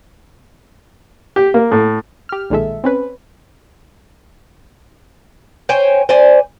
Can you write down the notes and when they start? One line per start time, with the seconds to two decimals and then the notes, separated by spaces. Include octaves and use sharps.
1.36 G4
1.54 A#3
1.72 A2
2.29 G4 F6
2.50 B1 A#2 D#3 G#3 A4 E5
2.84 C4 C#4 B4
5.69 C5 C#5 G5 G#5
6.09 C5 D5 G#5